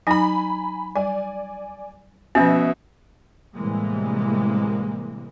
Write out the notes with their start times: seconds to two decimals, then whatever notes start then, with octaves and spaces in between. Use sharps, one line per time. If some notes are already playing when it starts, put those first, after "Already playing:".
0.07 F#3 D#4 G#5 A#5 B5
0.96 G3 D5 G#5
2.35 B2 F3 B3 C#4 E5
3.55 A2 C3 E3 G3 G#3 A#3